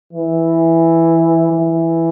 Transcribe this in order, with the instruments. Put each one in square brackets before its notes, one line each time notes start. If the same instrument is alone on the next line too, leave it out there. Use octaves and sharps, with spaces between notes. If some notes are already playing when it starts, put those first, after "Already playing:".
[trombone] E3
E3